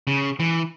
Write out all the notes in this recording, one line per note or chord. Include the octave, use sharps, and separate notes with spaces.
C#3
E3